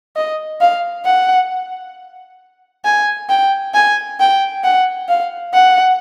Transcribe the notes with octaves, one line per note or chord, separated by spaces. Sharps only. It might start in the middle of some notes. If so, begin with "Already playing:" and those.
D#5
F5
F#5
G#5
G5
G#5
G5
F#5
F5
F#5